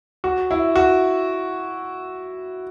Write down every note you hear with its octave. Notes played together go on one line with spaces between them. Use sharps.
F#4
E4
F#4